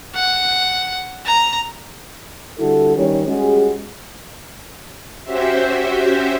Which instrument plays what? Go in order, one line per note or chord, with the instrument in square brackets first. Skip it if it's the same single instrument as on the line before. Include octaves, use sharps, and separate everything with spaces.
[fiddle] F#5
A#5
[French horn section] D3 G3 E4 F#4 A4
D#3 G3 C#4 C#5
G3 G#3 C#4 F#4 G#4
[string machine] C#4 F#4 G4 C5 E5